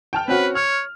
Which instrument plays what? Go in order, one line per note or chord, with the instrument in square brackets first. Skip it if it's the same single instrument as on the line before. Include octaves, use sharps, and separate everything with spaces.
[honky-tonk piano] G5 A5 F6
[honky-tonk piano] C4 C#4 F#4 [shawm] B4
[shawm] C#5 [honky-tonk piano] F6